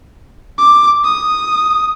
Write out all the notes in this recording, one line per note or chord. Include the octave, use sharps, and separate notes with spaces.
D6
D#6